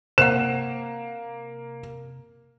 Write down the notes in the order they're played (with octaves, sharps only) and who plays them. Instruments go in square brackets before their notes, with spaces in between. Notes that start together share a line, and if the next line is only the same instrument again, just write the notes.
[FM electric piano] C3 [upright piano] A#3 [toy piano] C5 F#5 [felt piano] E7